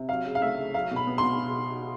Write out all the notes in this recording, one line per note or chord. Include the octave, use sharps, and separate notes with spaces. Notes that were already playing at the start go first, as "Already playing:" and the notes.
Already playing: C3
F#3 F5
C#3
F5
A3 E5
C#3
F#3 F5
B2
B5
B3
C6
B2